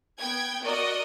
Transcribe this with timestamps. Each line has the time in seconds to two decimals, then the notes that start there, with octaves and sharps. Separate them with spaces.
0.18 B3 G5 G#6
0.64 F#4 A#4 D5 D#5